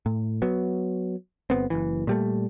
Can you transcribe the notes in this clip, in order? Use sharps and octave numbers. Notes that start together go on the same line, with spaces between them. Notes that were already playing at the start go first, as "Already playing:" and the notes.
A2
F#3 B3
G1 B3 C4
F#1 B1 E3
A#2 G3 A3